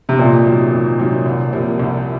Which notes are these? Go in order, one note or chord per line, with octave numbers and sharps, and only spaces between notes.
C3
F2 A#2
C3 D#3 F#3
F2
C3 D#3 F#3
C2
C3 F3 A#3
C2